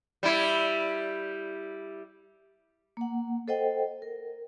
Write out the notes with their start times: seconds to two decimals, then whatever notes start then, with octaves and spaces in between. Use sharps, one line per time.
0.23 G3 E4
2.97 A#3 F#5
3.48 A4 C5 D#5 F#5 G5
4.02 A#4